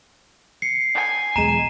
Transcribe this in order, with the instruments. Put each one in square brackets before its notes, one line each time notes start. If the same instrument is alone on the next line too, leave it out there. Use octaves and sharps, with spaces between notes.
[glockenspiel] C7 [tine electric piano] C#7
[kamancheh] G#5
[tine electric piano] B1 E2 G#3 [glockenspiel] A#5 D#7 E7